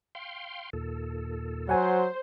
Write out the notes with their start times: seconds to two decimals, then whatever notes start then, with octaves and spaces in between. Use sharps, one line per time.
0.15 F5 G5 C6
0.73 D#2 A#2 A4
1.69 F#3 C5 F#5 G#5